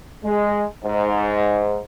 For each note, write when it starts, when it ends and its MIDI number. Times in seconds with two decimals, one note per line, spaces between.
0.25 0.63 56
0.84 1.79 44